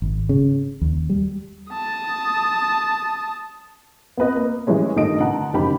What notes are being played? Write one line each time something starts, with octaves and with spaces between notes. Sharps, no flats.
G#1
C#3
D#2
G3
A5 D#6
B3 C4 B4 D#5
A#3
E3 G3 G#3 C#4
G2 D#3 G3 A4 D#5 D7
D3 F#5 A5 A#5
F#1 D#3 G4 B5